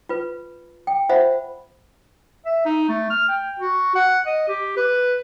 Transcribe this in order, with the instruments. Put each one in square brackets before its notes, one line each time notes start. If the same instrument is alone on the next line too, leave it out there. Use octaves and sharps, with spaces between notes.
[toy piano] F4 B4
G5
F4 C5 E5 F#5 B5
[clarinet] E5
D#4
A3
F6
G5
F#4
F#5
D#5
G4
B4